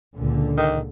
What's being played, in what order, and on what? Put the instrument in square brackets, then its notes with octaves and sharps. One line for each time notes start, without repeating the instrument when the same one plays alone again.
[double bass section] C#2 A#2 D3
[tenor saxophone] D#3